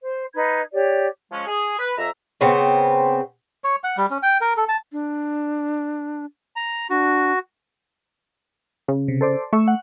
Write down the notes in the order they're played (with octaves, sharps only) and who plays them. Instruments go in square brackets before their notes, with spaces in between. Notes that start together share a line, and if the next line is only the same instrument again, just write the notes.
[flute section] C5
D#4 B4 B5 G#6
G4 C#5 D5
[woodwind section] F3 G#3 C#4
G#4
B4
F2 E5 A#5
[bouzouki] C#3 B3 C4
[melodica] C#5
F#5
G3
C#4
G5
A#4
A4
A5
[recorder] D4
[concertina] A#5
[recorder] D4 [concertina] F#4
[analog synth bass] C#3
[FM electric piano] C3
A4 C5 D5
[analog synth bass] A3 [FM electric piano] C#6 E6
[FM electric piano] F#5